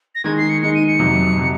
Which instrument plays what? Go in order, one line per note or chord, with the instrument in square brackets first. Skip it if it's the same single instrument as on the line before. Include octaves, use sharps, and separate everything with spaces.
[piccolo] A#6
[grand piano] D#3 G#3 D#4 [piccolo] G#6
[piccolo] C7
C#7
[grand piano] D#3 G#3 D#4 [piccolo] C#7
[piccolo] D#7
C#7
[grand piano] F2 C3 F#3
C3 F#3